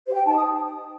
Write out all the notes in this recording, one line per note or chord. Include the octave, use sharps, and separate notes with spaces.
G4 C5
G5
D#4 A5
D#6